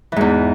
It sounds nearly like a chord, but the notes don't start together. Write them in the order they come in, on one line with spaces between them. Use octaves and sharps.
E3 G#2 E2